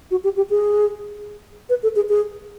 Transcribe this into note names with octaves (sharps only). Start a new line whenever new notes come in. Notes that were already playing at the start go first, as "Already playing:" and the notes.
F#4
G4
G4
G#4
B4
A4
G#4
G#4